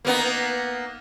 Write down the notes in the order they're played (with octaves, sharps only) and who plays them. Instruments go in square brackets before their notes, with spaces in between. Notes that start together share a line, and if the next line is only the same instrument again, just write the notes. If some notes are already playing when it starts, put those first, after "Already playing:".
[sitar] A#3 B3 D#4